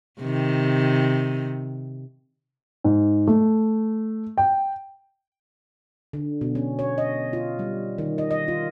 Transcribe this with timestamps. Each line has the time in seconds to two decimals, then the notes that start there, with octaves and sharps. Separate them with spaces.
0.21 C3 D#3
2.84 G#2
3.27 A3
4.38 G5
6.13 D3
6.41 B2
6.55 C#4
6.79 C#5
6.98 D#5
7.33 F4
7.59 G3
7.98 D#3
8.18 D#5
8.31 D#5
8.48 F4